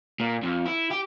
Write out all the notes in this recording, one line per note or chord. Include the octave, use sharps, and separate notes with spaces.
A#2
F2
E4
G4